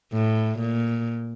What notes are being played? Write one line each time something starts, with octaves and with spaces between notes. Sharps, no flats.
A2
A#2